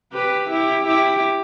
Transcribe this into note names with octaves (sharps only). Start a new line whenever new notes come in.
G4 B4
E4 G4
E4 G4